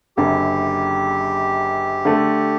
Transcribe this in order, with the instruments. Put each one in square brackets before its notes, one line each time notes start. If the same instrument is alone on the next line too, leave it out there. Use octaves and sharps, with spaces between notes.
[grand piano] F#1 F#2 D3 [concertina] G4
[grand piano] D3 A3